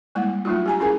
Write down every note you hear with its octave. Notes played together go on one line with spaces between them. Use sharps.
G3 G#3 A#3 E4 F#5
F#3 A3 D4 D#4 F4 F#4
G4 G#5 A#5
C#4 E4 G#4 A#4 G#5 A#5